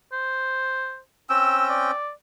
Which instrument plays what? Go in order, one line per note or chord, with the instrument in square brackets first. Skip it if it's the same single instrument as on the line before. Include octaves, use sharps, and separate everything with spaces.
[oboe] C5
[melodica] C4 C#4 G5 [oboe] E6
[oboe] D5